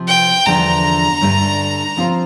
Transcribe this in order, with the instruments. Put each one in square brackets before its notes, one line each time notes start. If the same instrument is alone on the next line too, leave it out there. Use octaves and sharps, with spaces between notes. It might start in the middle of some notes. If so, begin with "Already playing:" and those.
Already playing: [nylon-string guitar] C3 F3 C4
[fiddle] G5
[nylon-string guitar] E2 D3 F3 A3 D4 [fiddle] A#5
[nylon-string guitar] G2 D3 A3
F3 C4 F4 C5